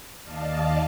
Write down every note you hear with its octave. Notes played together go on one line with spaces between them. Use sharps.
D#2 D5 D#5 F5 A5